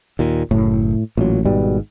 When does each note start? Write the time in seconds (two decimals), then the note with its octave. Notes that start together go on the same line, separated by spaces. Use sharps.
0.19 D#2 A#2
0.51 F#1 A2
1.17 A1 A#2 F#3
1.45 G#1 G#2 B2 G3